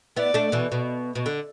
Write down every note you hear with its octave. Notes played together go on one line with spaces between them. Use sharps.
B3 E4 D5
A3 D4
B2 E3
B2
B2
D3